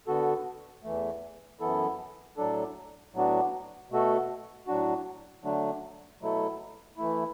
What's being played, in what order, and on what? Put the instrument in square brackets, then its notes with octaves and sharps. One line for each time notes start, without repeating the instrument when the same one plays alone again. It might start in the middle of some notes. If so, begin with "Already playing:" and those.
[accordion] D3 B3 F#4 A4
E2 E3 A3
F#2 E3 B3 E4 A4
A2 F#3 D4 A4
A2 F#3 B3 D4 F#4
B2 A3 F#4 A4
A2 F#3 D4 F#4
D3 F#3 A3 D4
B2 F#3 A3 E4 A4
E3 A3 E4